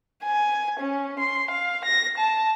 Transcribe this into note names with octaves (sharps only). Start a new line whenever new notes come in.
G#5
C#4
C6
F5
A#6
A5